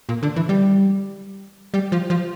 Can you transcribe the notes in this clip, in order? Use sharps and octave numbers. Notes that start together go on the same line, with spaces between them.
A#2
D3
E3
G3
G3
F3
F3